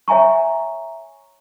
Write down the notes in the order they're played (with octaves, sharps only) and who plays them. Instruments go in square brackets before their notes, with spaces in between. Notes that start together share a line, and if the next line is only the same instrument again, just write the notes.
[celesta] C#5 E5 G#5 A#5 C#6